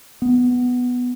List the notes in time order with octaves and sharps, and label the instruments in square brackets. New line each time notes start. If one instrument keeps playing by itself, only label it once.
[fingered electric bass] B3